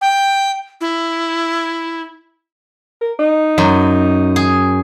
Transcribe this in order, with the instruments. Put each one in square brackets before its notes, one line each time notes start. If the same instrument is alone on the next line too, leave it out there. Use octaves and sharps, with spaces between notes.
[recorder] G5
E4
[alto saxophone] A#4
D#4
[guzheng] F#2
G#4